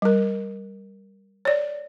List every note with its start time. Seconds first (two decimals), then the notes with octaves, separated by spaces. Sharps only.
0.02 G3 A#4
1.45 C#5 D5